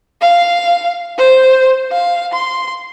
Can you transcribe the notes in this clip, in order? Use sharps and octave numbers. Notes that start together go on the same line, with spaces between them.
F5
C5
F5
C6